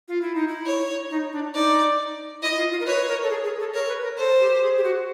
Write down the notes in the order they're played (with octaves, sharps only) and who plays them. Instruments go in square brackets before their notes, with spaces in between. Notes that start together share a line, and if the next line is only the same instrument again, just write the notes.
[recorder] F4
E4
D#4
E4
[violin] C#5
[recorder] D#4
D4
[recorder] D#4 [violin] D5
[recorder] E4 [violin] D#5
[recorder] F4
F4
A#4
[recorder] B4 [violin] C#5
[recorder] A#4
A4
G#4
G#4
A4
[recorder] A#4 [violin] C#5
[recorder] B4
A#4
[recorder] A4 [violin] C5
[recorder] G4
G4
G#4
G4
F#4